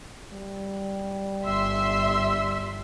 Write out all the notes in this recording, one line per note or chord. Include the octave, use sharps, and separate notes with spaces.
G3
G1 E5 C6 E6